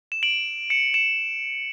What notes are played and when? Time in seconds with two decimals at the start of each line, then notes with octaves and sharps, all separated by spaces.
0.12 E7
0.23 D7 F#7
0.70 C#7 E7
0.94 C#7 E7